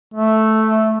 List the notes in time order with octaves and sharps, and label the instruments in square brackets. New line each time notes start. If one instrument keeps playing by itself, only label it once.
[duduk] A3